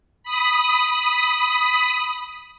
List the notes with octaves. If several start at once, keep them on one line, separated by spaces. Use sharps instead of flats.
B5 D#6